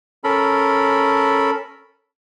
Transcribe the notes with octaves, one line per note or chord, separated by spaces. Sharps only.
C#4 A4 A#4 B5